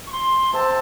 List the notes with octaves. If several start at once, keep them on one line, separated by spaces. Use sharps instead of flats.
C#6
C6
C3 C4 A5